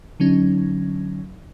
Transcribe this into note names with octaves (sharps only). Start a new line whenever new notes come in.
D3 F#3 C#4 D#4